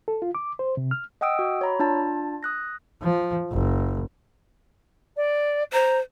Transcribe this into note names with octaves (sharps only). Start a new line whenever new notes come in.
A4
F4
D6
C5
C3
F6
D#5 F#5 G5 D#6 E6 D7
F#4
C#5 A#5 B5
D4 F4 A5 A6
D#6 F#6 A#6
F3
F#1
D5
C5 A#5